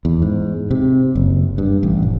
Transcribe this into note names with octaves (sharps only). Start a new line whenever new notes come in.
E2
G#2
C3
F#1
G2
A1
F1